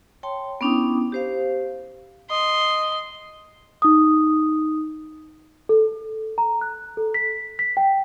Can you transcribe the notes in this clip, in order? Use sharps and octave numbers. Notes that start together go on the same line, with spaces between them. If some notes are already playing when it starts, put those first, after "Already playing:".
C#5 G5 A5 C6
B3 C#4 D4 E4 G5 D#6
G4 C5 F5
D#5 C6
D#4 D#6
A4
A#5
F#6
A4
B6
B6
G5